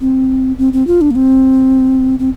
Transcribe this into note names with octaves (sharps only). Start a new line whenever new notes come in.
C4
C4
C4
F4
D4
A#3
C4
C4